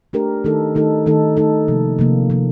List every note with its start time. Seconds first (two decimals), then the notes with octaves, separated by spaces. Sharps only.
0.13 A3 D4 G4 A#4
0.44 D#3 A3 D#4 A4
0.75 D#3 A3 D#4 A4
1.06 D#3 A3 D#4 A4
1.37 D#3 A3 D#4 A4
1.68 C3 F3 A#3
1.99 C3 F3 A#3
2.30 C3 F3 A#3